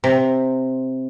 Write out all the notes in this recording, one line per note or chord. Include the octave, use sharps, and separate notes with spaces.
C3